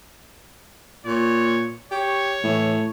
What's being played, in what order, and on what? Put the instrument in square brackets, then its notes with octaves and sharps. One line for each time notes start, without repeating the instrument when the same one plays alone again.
[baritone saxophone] A#2 [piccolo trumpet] C#5
[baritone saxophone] G4 [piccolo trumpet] C#5
[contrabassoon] A2 [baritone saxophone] E3